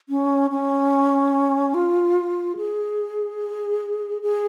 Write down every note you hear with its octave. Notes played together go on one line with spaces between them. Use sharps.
C#4
C#4
F4
G#4
G#4